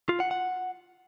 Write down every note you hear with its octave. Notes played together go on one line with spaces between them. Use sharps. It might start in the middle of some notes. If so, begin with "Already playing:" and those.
F4
F#5
F#5